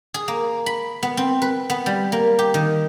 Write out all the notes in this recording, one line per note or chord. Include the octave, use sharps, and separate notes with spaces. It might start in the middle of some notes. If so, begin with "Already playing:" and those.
G#4
A#3
B5
B3
C4
B4
B3
G3
A#3
G4
D#3